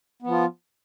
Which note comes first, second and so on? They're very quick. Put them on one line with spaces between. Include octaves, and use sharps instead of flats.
B3 F3 F4